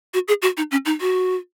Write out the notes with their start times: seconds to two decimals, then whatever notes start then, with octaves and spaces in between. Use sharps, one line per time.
0.14 F#4
0.28 G#4
0.42 F#4
0.57 D#4
0.71 C#4
0.86 D#4
1.01 F#4